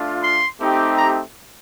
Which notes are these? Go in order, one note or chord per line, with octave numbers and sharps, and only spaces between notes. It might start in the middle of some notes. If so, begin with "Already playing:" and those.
Already playing: A3 D4 F4
C6
A3 C4 D#4 G4
A#5